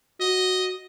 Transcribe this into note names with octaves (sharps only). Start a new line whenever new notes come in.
F#4 D#5